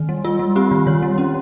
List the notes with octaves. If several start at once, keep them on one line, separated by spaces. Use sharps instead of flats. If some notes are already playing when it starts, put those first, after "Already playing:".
Already playing: D#3
G3
G3 F4
G3
C4 G4
D#3
D#3 C#5
G3
C#4